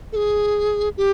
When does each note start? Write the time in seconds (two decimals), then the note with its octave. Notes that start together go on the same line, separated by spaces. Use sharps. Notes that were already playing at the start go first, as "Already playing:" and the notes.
0.12 A4
0.16 G#4
0.97 G4